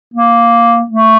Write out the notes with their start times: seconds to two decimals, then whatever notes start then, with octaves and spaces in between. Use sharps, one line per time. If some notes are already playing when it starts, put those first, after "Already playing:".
0.14 A#3
0.90 A3